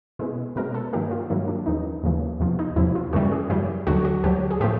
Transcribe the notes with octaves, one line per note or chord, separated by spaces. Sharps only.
B2 G#3 B3 E4
B2 G#3 B3 A#4
A4
G2 D#3 F#3 A#3 G4
F4
G2 D#3 F#3 A#3 E4
D4
D#2 C#3 E3 D#4
D#2 C#3 E3
E2 C3 F3
D#4
E2 C3 F3 E4
F4
F#2 C#3 E3 G3 F#4
G#4
F#2 C#3 E3 G3 G4
D2 D3 F#3 F#4
F#4
D2 D3 F#3 G4
G#4
A2 F3 A3 G4